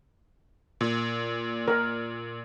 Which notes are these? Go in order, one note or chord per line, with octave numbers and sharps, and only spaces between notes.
A#2
A#4